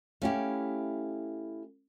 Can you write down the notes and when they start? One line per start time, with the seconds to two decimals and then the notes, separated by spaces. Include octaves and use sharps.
0.22 A3 C#4 E4 G4 E5 F5